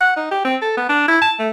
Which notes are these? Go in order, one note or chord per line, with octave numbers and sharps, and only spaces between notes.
F#5
D#4
G4
C4
A4
B3
D4
E4
A5
A3